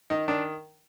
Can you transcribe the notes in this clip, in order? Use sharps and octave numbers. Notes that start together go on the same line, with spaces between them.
D#3 D#4
D#3 D4